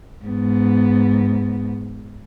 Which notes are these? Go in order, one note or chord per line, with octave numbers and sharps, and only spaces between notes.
G#2 B3